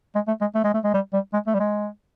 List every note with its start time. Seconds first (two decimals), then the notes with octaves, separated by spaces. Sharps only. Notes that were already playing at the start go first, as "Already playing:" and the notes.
0.15 G#3
0.28 A3
0.41 G#3
0.55 A3
0.64 G#3
0.74 A3
0.84 G#3
0.94 G3
1.13 G3
1.33 G#3
1.47 A3
1.55 G3
1.60 G#3